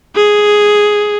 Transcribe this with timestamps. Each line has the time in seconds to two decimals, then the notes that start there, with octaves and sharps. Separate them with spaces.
0.16 G#4